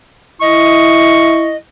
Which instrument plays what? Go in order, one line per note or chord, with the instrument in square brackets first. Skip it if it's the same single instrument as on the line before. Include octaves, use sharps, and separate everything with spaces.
[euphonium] E4 [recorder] D#5 [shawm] C#6